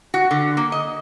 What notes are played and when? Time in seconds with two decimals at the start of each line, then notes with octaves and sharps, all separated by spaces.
0.14 F#4
0.31 D3
0.57 A#3
0.72 D#5